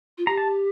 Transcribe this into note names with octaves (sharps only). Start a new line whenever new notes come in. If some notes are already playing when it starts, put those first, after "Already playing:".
F4
G4 A#5
A5